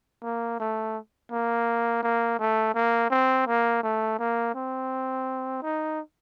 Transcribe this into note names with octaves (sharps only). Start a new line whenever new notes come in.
A#3
A3
A#3
A#3
A3
A#3
C4
A#3
A3
A#3
C4
D#4